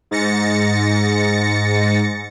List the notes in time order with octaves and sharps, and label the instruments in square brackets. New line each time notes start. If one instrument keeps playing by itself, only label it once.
[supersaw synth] G#2 A6 A#6 C#7